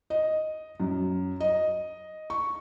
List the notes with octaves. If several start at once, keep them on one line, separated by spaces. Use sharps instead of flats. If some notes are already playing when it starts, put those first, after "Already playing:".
D#5
F#2
D#5
C#6